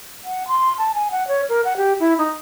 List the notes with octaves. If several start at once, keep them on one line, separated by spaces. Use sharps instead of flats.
F#5
C6
A5
G#5
F#5
C#5
A#4
F#5
G4
E4
D#4